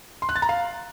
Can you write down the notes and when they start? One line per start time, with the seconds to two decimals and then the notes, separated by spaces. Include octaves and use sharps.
0.22 C6
0.29 F#6
0.36 A6
0.42 A#5
0.49 F5